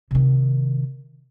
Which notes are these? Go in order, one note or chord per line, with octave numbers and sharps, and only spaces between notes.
C3 D#3